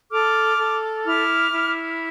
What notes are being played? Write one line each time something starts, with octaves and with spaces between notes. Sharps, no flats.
A4 D6 F6
A4
E4 D6 F6
E4